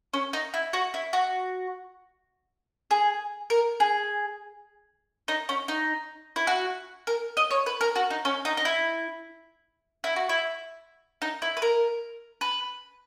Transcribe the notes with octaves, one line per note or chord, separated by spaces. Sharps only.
C#4
D#4
E4
F#4
E4
F#4
G#4
A#4
G#4
D#4
C#4
D#4
E4
F#4
A#4
D#5
C#5
B4
A#4
F#4
D#4
C#4
D#4
D#4
E4
E4
F#4
E4
D#4
E4
B4
A#4
B4